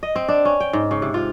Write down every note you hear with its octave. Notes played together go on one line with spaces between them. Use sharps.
D#5
C4
D4
C#4
G5
G#2
C#3
C3
F4